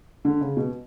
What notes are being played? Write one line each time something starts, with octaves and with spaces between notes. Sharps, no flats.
D3
C#3
B2